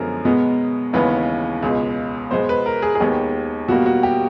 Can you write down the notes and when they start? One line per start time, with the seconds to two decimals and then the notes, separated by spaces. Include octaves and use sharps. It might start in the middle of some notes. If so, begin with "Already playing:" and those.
Already playing: F#2 D3 F3 G#3 B3 A#4
0.25 B2 G#3 B3
0.93 D#2 C#3 E3 G#3 B3 B4
1.63 C#2 B2 G#3
2.31 B2 G#3 B3 C5
2.49 B4
2.66 A#4
2.82 G#4
2.95 G#4
3.00 D#2 D#3 G#3 B3 G4
3.68 B2 G3 A#3 F#4
3.86 F#4
4.03 G4